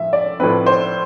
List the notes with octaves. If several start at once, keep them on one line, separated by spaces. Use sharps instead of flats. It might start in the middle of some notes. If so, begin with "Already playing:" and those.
Already playing: A2 F3 E5
D5
A2 F3 A3 C4 B4
C5